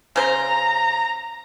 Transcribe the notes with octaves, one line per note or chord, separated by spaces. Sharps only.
C#3 C5 A#5